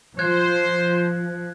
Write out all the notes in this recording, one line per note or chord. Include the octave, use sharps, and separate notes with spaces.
F3 C5 F#6 G#6